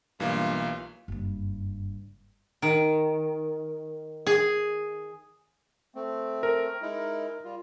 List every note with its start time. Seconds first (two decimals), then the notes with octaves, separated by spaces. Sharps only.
0.20 B1 G2 E3 A#3 F4 F5
1.08 F#1 G2
2.62 D#3
4.27 G#4
5.95 A3 C4
6.43 A#4
6.82 G#3 D#4 E4
7.44 G3 F4